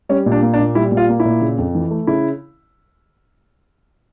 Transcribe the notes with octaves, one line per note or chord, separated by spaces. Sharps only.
G3 C#4
A#2
D4
A#3
D4
A#2
G3 E4
A#2
F4
A#3
E4
A#2
C#3
F2
E3
A3
C#3 E4